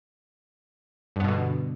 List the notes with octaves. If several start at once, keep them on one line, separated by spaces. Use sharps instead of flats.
G2 B2 D3 B3